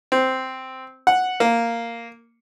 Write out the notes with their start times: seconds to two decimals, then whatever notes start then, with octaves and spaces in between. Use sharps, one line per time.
0.12 C4
1.07 F#5
1.40 A#3